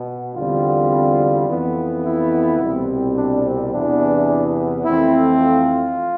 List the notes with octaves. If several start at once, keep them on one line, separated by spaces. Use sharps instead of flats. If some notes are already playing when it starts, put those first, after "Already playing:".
Already playing: B2 B3
E2 D3 G3 C4 F4
F2 E3 B3
E4
C2 B2 G3 C4
D4
C4
E2 C3 E3 B3 D4
F2 E3 A3 C4 E4
F4